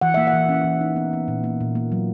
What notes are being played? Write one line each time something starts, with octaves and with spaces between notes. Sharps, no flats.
E3 F#5
A#3 E5
F#5
E3
C#4
E3
D#4
B3
B3
A#2
A#3
A#2
A#3
F#3